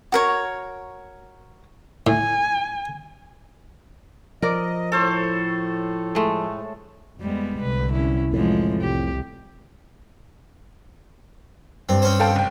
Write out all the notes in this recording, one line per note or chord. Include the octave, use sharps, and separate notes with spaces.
F#4 A#4 C#5
A2 G#5
F3 A#4 D5 D#5
A2 A4 C5 C#5
G#3 A3
F2 G3 G#3 B3
C2 D3 B4
C#4 E4
F2 A2 E3 F3 G#3
C2 G4
G2 C4
C4 C#4 C5
A4 F5 G5
F1 G5